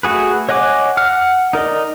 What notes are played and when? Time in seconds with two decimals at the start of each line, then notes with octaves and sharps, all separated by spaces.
0.03 A3 F#4 G#4 B4
0.49 C#5 D#5 F#5 G#5 D6
0.97 F#5 F6
1.53 D#4 A#4 D5 D#5